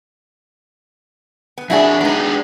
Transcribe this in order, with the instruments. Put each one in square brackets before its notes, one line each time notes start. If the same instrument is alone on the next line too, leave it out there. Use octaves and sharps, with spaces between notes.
[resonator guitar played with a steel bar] B3
[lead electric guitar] F2 D4 [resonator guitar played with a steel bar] E4 F#4 G#4
[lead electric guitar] G#3 D4 [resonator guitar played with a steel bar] B3 D#4